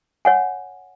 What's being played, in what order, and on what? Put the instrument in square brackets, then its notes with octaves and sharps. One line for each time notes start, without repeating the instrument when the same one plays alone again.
[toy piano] C#5 F#5 G#5